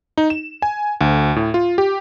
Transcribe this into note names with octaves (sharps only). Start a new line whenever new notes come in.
D#4
E7
G#5
D2
A2
F4
G4